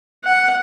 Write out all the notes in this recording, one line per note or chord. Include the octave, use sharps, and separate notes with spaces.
F#5